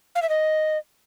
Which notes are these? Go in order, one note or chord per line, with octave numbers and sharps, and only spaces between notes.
F5
E5
D#5